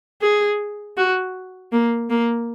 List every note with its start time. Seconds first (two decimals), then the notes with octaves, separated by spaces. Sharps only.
0.22 G#4
0.97 F#4
1.72 A#3
2.10 A#3